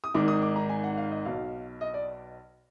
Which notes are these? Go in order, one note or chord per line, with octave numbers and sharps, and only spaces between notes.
D#6
G#1 G#2 D#3 D6
D#6
D6
A#5
G#5
F#5
F#5
F5
D#5
B1 B2 F5
D#5
D5